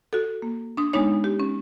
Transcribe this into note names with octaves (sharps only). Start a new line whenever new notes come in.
F#4 A4
A#3
D4 C6 D#6
G#3 B3 D4 D#4 C#5
G4
C#4